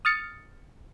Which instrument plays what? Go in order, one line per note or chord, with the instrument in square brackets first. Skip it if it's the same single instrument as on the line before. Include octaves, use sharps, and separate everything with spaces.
[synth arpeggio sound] D#6 F6 A6 C#7